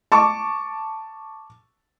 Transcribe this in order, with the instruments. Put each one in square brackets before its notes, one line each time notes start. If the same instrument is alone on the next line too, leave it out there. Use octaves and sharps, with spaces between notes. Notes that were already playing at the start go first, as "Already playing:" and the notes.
[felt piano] A5 C#6 D6